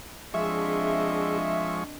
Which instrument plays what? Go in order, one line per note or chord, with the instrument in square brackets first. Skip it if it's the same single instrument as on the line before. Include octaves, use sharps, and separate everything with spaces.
[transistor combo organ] F3 G#3 C#6 [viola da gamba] C4 D4 D#5 [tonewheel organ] G#4 [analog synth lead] E5